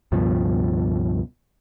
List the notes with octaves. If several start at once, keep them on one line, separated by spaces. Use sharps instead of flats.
C#2 G2 B2 F3